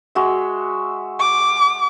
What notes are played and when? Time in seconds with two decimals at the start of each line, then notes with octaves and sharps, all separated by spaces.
0.15 G#3 F#4 E5
1.20 D6